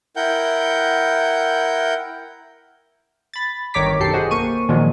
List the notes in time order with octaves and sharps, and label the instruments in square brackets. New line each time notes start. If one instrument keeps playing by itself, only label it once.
[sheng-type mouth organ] E4 A#4 F#5 G5 G6
[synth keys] B5 A6
G1 D#3 C#5 A#5 D6 B6
B1 F#2 G4 A4 C7 C#7
F#4 G#4 C5 D#5
A#3 C#6 D#7
A#2 D#3 F3 F#3 G#3